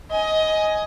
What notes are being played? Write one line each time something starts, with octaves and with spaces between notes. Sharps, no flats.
D#5 G#5